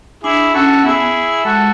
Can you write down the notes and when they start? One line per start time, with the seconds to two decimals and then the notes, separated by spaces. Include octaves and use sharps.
0.23 D4 E4 G#4
0.54 C#4 F#4 A4
0.83 B3 E4 G#4
1.44 G#3 F#4 A4